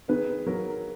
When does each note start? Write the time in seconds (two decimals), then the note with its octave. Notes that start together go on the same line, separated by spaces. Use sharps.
0.08 D#3 G#4 B4
0.47 F#3 A#4